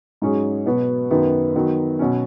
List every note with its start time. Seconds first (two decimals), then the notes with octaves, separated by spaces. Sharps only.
0.22 G#2 F#3 C#4 G#4
0.66 B2 F#3 B3 F#4
1.11 F#2 D#3 B3
1.55 D#3 F#3 B3 D#4
1.99 B2 F#3 C#4